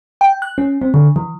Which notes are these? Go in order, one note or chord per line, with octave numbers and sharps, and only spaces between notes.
G5
F#6
C#4
C4
D3
E3